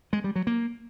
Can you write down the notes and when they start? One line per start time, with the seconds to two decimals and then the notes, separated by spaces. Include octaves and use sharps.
0.13 G#3
0.24 G3
0.36 F#3
0.47 A#3